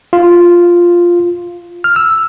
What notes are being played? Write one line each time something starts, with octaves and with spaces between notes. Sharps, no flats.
F4
F6
E6